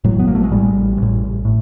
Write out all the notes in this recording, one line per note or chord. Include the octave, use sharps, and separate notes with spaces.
A1 A2 F#3
B3
A#3
A3
G#3
A1 A2 G3
A1
A2
A2